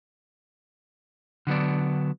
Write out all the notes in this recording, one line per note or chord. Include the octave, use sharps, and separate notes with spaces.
D3 F#3 B3 D4